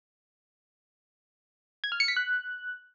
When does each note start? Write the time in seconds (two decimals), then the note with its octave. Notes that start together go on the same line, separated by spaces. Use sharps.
1.84 G#6
1.92 F6
2.00 C#7
2.08 B6
2.17 F#6